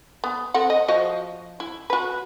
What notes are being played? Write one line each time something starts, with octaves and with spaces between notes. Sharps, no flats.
B3
C4 A4 F#5
D#5
F3 F#4 D#5
E4
F#4 B4